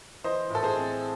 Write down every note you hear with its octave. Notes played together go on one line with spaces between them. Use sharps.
E3 C5 D#5
A2 A4
G#4 C5
C4